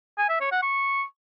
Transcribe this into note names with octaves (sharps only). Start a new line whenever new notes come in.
G#5
E5
C#5
F#5
C#6